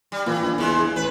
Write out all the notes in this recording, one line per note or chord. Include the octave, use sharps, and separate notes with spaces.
G3
A#2 E3
A#1
E2 C#3 G#3
A1 B4